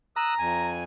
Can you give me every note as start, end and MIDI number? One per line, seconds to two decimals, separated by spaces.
0.17 0.69 82
0.17 0.34 87
0.17 0.34 88
0.17 0.34 90
0.39 0.84 41
0.39 0.84 80